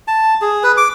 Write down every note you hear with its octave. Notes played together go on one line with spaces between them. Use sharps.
A5
G#4
B4
D6